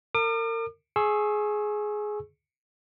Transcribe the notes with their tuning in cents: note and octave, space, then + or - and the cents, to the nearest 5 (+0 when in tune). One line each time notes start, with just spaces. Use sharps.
A#4 -35 D6 +40
G#4 +15 C#6 -25 E6 +0